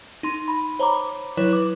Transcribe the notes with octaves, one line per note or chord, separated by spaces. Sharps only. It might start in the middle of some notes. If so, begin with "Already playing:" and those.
D#4 C6
B5
C5 C#5 A#5 B5 D6
D6
F#3 E4 B4 C#5
D6